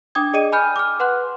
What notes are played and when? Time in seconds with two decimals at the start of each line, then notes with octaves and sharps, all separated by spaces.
0.15 D4 G5 D6 D#6 G#6
0.33 G#4 D5 D#5 G5 D#7
0.52 G#5 B5 F6 G6
0.76 D6 F6
1.00 B4 F#5 C6 F#6